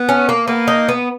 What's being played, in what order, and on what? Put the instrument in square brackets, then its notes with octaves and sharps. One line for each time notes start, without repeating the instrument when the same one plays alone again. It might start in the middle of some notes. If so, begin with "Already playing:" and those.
Already playing: [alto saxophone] B3
[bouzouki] C#4
A#3
[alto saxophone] A#3 [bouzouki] B3
[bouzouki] D#4
B3